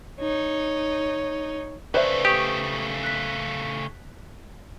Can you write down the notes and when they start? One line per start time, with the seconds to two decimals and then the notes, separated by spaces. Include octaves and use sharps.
0.20 D#4 C#5
1.94 C#3 A3 B4 C5 D5 E5
2.25 G4 C#6 D#6
3.04 F#6 B6